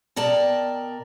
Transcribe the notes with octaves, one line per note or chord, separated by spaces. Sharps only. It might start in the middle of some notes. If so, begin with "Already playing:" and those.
B2 A#4 D5 G5 A5